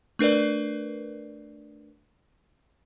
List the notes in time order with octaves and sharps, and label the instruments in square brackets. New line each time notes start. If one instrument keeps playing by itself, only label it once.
[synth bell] A3 D4 A#4 B4 D5